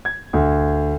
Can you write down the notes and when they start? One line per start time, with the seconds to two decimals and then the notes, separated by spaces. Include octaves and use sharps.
0.05 G#6
0.33 D2